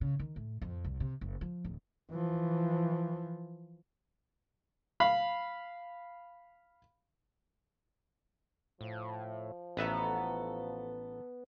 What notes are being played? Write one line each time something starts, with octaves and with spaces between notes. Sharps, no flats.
C#3
D#3
A2
F2
C2
C3
F#1
F3
D1
E3 F3
F5 B5
A2 F3
A1 B3 F#4 A4 B4 E5 A#5